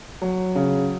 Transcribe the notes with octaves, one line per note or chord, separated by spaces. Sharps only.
F#3
C#3